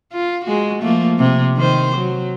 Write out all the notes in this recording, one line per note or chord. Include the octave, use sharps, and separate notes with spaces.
F4
G#3 F#4
F3 A3 A#3
C3
D#3 C5
F#3